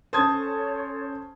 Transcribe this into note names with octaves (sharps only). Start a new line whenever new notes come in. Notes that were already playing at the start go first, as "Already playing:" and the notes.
C#4 A4 C5 C#5 A5 D#6 G#6